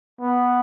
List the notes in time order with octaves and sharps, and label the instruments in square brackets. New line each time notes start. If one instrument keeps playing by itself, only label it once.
[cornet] B3